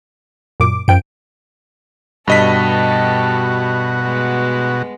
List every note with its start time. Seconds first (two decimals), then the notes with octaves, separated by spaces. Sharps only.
0.60 F#2 A#2 D6
0.88 F#2 F3 G5 D7
2.28 G2 B2 F#4 G4 A4 D#5 B6
4.00 G#3 B3